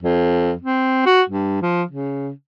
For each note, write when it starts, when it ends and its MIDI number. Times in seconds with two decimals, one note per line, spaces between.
0.03 0.52 41
0.61 1.05 60
1.06 1.22 66
1.30 1.60 43
1.62 1.83 53
1.91 2.31 49